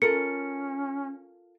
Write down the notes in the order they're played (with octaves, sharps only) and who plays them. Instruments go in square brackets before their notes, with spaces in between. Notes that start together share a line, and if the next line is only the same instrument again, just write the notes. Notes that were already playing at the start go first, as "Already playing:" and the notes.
[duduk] C#4 [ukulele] F4 A4 A#4 [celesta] C#7